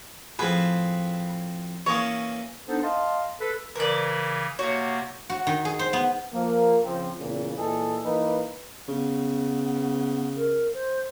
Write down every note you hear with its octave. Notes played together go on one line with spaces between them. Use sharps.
A2 F3 C4 G#4 B4
E3 A#3 C#4 C#5 D#6
B3 D4 D#4 A4 C5
D#5 F5 A5 C6
A4 B4
C#3 E3 A#4 B4 D5
C3 A#3 F#4 C#5
F#4
D#3
G#4
C5
B3
F3 A#3
C#3 F3 C4
E2 A#2 C#3
A#2 E3 G#3 G#4 A4
E3 A#3 D#4 B4
C#3 B3
A#4
C5